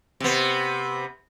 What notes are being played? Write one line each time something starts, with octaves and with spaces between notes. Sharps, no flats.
C3 B3